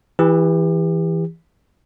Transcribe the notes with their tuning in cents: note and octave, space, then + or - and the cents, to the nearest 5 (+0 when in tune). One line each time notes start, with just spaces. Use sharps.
E3 +0 G4 +35